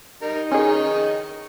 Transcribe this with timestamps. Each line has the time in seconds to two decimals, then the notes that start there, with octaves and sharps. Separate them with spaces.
0.22 G3 D#4 A#4
0.52 D#3 C#4 G#4 D#5 C#6